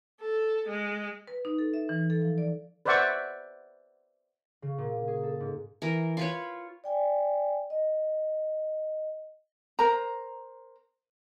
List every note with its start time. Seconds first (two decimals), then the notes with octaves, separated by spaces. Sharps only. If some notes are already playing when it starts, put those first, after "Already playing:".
0.21 A4
0.69 G#3
1.28 B4
1.45 D#4
1.58 A4
1.74 E5
1.89 E3
2.10 A4
2.22 F3
2.38 D5
2.85 B4 C5 D5 E5 F#5 C#6
4.62 C#3
4.78 A#2
5.07 G#4
5.23 A4
5.40 G#2
5.82 E3 A#4
6.17 F4 B4 C#5
6.84 D5 G5 G#5
7.70 D#5
9.79 A#4 C5 A#5